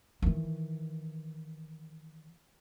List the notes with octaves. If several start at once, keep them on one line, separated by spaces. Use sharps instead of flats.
D#3 E3